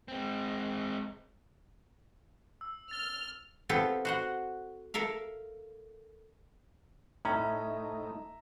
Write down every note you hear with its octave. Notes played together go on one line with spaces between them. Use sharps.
G#3 C4
E6
F6 A6 G7
B3 C4 F4 G4 A4
F#4 C5 F#5
A4 A#4 E5 F5
A2 A3 C#4 D#4 E5 A#5